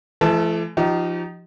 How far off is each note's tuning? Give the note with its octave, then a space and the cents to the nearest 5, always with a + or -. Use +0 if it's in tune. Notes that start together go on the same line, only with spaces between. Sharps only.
E3 +40 A3 -30 A5 +0
F3 -10 D#4 +0 G4 -35